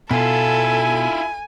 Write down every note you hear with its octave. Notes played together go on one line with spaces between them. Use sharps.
B2 E4 F4 A4 G#5